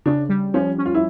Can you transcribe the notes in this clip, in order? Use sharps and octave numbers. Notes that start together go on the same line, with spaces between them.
C#3 D4
G3
F3 C#4
C#4
F4
E4